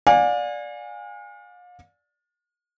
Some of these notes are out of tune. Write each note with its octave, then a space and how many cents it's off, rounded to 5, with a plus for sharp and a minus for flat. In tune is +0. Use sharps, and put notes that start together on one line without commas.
D5 +0 F5 +40 G#5 -25